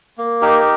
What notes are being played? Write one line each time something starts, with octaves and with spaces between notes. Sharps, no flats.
A#3
D#4 G4 A#4